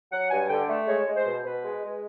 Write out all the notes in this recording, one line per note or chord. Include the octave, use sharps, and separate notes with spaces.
F#3 F#5
G2 G#5
D3 G5
A3
G#3 C#5
G#3
C5
B2
B2 B4
G#3
G#3